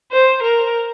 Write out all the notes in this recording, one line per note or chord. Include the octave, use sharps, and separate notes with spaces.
C5
A#4